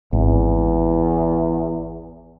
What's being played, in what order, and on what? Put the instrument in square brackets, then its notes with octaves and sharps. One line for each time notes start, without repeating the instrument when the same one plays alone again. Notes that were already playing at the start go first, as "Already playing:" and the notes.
[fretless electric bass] G#1 [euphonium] E2